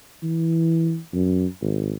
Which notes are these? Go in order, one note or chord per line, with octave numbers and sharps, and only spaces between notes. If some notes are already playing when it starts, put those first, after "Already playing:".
E3
F#2
G#1